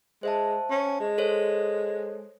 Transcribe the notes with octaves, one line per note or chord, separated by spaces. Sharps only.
G#3 C5 E5 A5
C#4
G#3
A4 C5 C#5